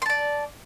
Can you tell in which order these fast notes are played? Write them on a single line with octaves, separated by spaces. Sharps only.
C6 A5 D5